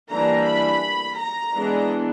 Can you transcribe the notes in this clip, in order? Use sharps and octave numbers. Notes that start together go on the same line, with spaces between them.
E3 G3 A#3 D4 A#5
B5
A#5
E3 G#3 B3 D4